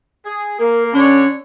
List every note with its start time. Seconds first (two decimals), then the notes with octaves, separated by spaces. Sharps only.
0.25 G#4
0.59 A#3 A#4
0.93 D3 C#4 D4 C#5